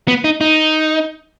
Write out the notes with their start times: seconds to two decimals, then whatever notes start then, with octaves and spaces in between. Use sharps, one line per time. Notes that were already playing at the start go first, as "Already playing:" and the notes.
0.08 B3
0.24 D#4
0.41 D#4